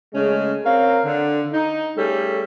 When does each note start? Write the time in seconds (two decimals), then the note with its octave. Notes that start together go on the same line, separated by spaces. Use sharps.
0.14 C#3 G#3 A3 C#4 G#4
0.65 C4 A#4 C#5 F5
1.04 D3
1.52 D#4
1.96 G3 A3 C#4 G#4 A4